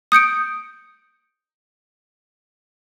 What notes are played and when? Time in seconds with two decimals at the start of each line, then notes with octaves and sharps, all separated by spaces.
0.12 D#6 G6 C#7 D7